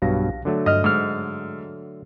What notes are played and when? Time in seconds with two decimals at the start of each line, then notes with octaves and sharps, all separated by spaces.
0.02 B1 G2 B2 F#3 F5 A#6
0.45 D3 F#3 A3
0.66 G2 D#5 F6
0.84 G#2 E6 F6